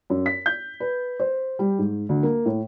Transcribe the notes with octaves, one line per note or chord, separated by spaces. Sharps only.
F#2
B6
G6
B4
C5
G3
G#2
D2
A#3
A2